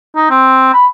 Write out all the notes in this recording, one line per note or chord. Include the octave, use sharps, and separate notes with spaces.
D#4
C4
B5